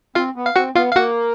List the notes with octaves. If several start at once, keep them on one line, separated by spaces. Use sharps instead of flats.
C4 F4 F5
B3
F5
C4 F#4 F#5
B3 F4 F5
F5
A#3 F#4 F#5